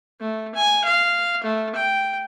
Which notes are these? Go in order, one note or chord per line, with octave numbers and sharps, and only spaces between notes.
A3
G#5
F5
A3
G5